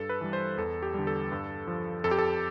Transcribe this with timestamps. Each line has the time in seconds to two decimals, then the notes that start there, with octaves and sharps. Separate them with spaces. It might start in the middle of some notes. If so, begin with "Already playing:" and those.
Already playing: G2 A4
0.09 B4
0.21 E3 G3
0.33 C5
0.57 E2 A4
0.83 G4
0.94 D3 G3
1.07 A4
1.32 G2
1.67 F3
2.04 F2 A4
2.11 G4
2.19 A4